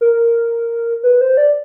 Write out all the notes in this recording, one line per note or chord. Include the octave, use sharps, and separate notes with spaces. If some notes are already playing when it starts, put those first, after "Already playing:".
A#4
B4
C5
D5